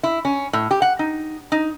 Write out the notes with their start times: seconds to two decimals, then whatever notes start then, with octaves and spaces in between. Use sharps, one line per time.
0.03 E4
0.25 C#4
0.53 A2
0.71 G4
0.82 F#5
0.99 D#4
1.52 D#4